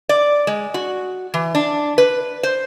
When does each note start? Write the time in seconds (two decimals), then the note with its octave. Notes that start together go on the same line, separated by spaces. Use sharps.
0.09 D5
0.47 G#3
0.74 F#4
1.34 E3
1.55 D4
1.98 B4
2.43 C5